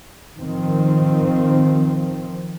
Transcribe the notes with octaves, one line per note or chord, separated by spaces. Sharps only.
D#3 F3 C4